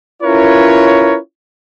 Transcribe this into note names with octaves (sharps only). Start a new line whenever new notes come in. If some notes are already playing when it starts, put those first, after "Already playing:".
C#4 E4 F4 A#4 B4 C#5